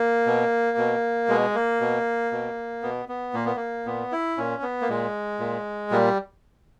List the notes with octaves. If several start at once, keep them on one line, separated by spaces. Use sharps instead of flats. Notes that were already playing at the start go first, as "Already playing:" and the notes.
Already playing: A#3
B2
B2
B2 G#3
A#3
B2
B2
B2 B3
B3
A#2 A#3
B3
A#3
A#2 B3
E4
A#2 C#4
B3
A#3
A#2 G#3
A#2
A#2 G3